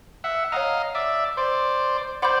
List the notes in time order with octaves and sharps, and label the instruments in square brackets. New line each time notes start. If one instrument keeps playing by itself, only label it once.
[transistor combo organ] E5 F#5
[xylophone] C#5 F#5 A#5 [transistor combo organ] D#5 F5
[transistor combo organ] D5 E5
C5 D5
[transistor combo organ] C5 D5 [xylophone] F#5 B5 D6 G6